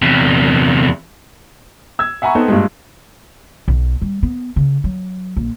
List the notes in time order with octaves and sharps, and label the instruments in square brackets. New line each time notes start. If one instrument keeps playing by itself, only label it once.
[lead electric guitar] E2 C3
[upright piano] E6 G#6
E5 F#5 G#5 A#5 B5 C#6
B3 C4 D#4 A4 C5
G2 A#2 G3 G#3
[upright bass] B1
G3
B3
C#3
F#3
A#1